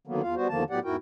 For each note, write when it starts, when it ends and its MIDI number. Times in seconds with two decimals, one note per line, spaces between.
0.07 0.22 50
0.07 0.22 51
0.07 0.22 54
0.07 0.22 58
0.07 0.22 59
0.22 0.35 40
0.22 0.35 65
0.22 0.35 77
0.35 0.48 55
0.35 0.48 59
0.35 0.48 66
0.35 0.48 72
0.49 0.64 40
0.49 0.64 50
0.49 0.64 51
0.49 0.64 53
0.49 0.64 58
0.49 0.64 81
0.70 0.80 45
0.70 0.80 54
0.70 0.80 59
0.70 0.80 67
0.70 0.80 74
0.70 0.80 78
0.84 0.96 40
0.84 0.96 44
0.84 0.96 64
0.84 0.96 66
0.84 0.96 70
0.84 0.96 79